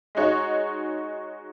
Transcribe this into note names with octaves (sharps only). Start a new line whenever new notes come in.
G#3 D#4 F#4 C#5